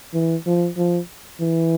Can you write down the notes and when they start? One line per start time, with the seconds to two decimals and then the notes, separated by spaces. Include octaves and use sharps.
0.14 E3
0.46 F3
0.77 F3
1.41 E3